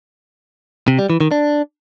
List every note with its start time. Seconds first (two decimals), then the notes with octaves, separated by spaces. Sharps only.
0.88 C3
0.99 G3
1.10 E3
1.21 D#3
1.31 D4